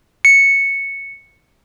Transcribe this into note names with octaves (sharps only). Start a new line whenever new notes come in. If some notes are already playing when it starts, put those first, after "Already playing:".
C#7